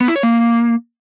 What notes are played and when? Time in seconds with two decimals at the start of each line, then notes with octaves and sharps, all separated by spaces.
0.01 B3
0.08 E4
0.16 C#5
0.23 A#3